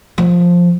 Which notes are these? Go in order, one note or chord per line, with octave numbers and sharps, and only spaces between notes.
F3